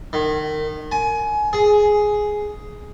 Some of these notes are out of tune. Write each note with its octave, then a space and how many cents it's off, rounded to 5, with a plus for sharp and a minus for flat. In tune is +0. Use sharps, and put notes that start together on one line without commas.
D#3 -25
G#5 +20
G#4 +5